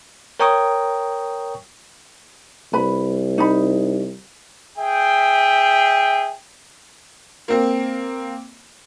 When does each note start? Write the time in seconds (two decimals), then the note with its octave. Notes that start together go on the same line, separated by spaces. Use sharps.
0.40 A#4 C#5 G5 A#5 C#6 D#6
2.73 C2 B4 B5
3.38 D#4 B5
4.78 G#4 E5 G5
7.48 A#3 C4